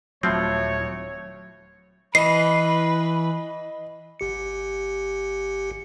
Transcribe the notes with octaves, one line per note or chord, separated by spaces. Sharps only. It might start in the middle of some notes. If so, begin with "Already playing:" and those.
D#1 A2 F3 F#3 A3 C4 C#5
E3 B4 D#5 C7
G1 G4 C#7